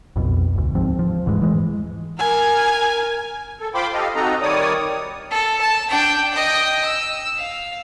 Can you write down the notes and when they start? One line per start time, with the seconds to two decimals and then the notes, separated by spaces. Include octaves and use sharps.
0.16 B1 F2 B2
0.55 G#1 D2
0.75 D#2 G#2 F3 C4
0.99 F3
1.26 D#1 G#2 E3 G#3
1.42 E3 G#3
2.19 A#4 G#5
3.58 A4
3.74 F4 C5 G5 B5 C6 D6
3.94 G4 A4 D#5 F5
4.15 C4 D#4 F#4 A4 D#5 A#5
4.42 D#3 G3 C#5 D5 D#6
5.30 A4
5.61 A5
5.90 D4 G5
6.32 D#5 G5
6.85 E6
7.37 F5